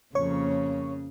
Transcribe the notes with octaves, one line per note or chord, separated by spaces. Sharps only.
F2 C#3 A#3 C#5 C#6